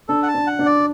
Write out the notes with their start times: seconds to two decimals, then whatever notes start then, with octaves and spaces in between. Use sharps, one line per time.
0.09 D4 A4
0.23 F#5
0.28 A5
0.34 D4
0.47 F#5
0.59 D4
0.66 D5